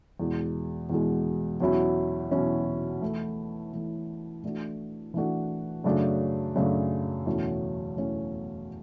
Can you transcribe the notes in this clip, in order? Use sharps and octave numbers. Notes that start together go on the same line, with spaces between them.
E2 B2 G#3
E2 B2 G#3
E2 B2 F#3 C#4 E4
E2 B2 F#3 C#4 E4
E3 A3 E4
E3 A3 E4
E3 A3 D4 F#4
E3 A3 D4 F#4
F#2 C#3 F#3 A3 D4
F#2 C#3 F#3 A3 D4
E2 B2 A3 C#4
E2 B2 A3 C#4